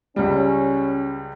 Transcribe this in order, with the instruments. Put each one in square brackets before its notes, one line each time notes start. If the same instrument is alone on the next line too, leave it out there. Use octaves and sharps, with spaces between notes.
[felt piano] C#2 G3 [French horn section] C#4